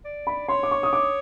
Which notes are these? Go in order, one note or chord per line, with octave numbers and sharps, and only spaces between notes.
D5
B5
C#5 C6
D6
C#6
D#6
D6